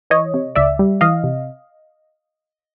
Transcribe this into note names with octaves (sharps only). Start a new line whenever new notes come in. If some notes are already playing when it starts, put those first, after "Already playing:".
E3 C#5 D#5
C3
C#2 D5 E5
G3
E3 D#5 F5
C3